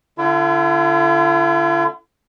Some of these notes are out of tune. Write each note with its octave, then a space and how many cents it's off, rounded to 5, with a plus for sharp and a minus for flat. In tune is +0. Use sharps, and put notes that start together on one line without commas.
D3 +0 E4 +45